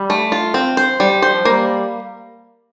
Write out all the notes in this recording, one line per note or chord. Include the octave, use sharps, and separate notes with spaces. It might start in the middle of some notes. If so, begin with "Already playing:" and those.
Already playing: G3
A3
F4
C4
C5
G3
C5
F3
G3 A#3